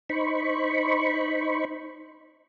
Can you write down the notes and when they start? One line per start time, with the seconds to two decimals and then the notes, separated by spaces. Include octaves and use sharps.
0.10 D#4 C5 B5 C#6